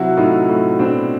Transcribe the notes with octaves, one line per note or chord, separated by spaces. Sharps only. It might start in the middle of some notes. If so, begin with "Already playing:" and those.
Already playing: C3 F#3 E4 F#4
A2 D#4 F4
A2
B2 C4 D4